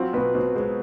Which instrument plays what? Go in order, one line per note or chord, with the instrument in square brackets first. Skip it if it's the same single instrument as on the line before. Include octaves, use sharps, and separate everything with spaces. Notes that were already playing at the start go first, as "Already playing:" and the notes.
Already playing: [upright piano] F#3 C4 [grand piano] F4 F#4
[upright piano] B2 [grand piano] B4
[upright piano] B2 [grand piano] C5
[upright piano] G#3 [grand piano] C5